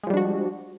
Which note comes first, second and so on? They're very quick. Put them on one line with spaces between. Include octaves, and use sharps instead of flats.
G#3 F3 G3 D4 F#4